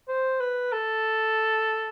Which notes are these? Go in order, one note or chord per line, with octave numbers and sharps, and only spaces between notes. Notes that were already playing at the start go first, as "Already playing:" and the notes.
C5
B4
A4